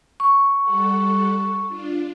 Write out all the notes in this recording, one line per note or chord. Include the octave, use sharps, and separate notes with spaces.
C#6
G3 A4 F#5
D4 F4